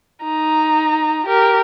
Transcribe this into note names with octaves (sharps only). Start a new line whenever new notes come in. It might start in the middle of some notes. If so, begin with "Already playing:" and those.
D#4 A#5
G4 A#4